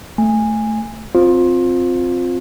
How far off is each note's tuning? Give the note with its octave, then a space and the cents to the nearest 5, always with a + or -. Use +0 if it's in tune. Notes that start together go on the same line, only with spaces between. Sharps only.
A3 +0 G#5 -15
C4 +0 F4 +20 C5 +0